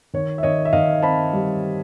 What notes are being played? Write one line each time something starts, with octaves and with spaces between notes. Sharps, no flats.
D#3 C#5
E5
D#3 C#5 D#5
E5
D#3 D#5 F5
C4 A5 B5
G3